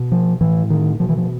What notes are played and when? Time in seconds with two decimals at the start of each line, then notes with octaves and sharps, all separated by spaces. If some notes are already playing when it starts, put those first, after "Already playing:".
Already playing: B2
0.12 F3
0.41 A2 E3
0.70 D#3
1.00 B2 F3
1.09 E3
1.17 F3